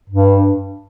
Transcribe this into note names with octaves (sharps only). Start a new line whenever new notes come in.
G2